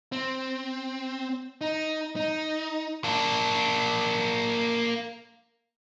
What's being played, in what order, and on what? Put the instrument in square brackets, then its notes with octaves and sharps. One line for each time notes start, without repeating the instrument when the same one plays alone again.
[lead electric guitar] C4
D#4
D#4
A#3 D4